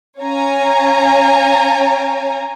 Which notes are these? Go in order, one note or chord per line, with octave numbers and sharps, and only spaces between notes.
C#4 C#5 F5 G#5 A#5